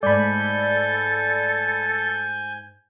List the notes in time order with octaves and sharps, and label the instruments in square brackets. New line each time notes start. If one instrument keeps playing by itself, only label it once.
[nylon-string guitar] G#2 A3 [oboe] A4 [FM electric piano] D5 B5 [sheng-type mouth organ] G#5 G6